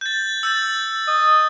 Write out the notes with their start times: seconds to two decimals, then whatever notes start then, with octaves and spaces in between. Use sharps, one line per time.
0.01 G6 A6
0.43 E6 G6 A6
1.08 D#5